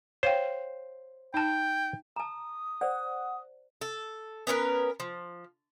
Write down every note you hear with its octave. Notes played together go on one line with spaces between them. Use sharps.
C5 C#5 F5 G5
D#4 G5 A5
A5 A#5 D#6
C5 D5 F#5
A4
B3 C#4 A#4 B4
F3